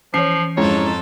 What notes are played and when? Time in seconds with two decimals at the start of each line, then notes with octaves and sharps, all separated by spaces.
0.14 E3 F3 C#4 C#5 C7
0.57 F2 G#2 C#4 E4 F4 A4 C#5